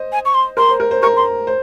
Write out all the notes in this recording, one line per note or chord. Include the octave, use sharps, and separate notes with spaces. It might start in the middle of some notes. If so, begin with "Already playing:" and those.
Already playing: C5 D#5
G#5
C#6
C6
A#4 C6
C5
A#4
C5
A#4 C#6
C6
C5